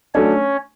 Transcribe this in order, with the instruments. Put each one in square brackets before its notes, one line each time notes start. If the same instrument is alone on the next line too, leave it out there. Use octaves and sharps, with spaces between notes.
[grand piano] F#3 A3 D4 [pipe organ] C#4 C#5